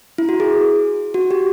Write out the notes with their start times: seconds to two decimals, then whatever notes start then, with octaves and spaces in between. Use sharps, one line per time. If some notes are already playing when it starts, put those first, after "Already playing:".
0.18 E4
0.29 F#4
0.40 G#4
1.14 F#4
1.31 G4